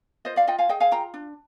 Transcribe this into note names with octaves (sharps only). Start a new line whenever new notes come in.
F4 C5 D#5
D5 F5
F4 D#5 G5
F5 G#5
G#4 D#5 G5
F5 G#5
F4 G5 A#5
D4